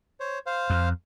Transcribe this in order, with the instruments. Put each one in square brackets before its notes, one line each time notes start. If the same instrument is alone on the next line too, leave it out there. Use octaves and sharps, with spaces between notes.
[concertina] C5 C#5
C5 F5
[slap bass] F2